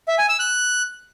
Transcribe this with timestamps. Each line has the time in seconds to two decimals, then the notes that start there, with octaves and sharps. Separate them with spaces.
0.08 E5
0.18 G#5
0.29 E6
0.39 F#6